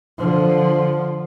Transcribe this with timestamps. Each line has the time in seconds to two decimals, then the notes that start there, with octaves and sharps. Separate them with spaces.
0.18 D3 F3